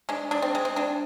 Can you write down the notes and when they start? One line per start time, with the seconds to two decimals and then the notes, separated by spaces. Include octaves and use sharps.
0.09 G#3 D4
0.31 G#3 D4
0.42 C4
0.55 G#3
0.65 C4
0.76 G#3 D4